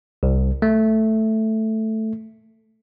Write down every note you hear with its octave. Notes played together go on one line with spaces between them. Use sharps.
C2
A3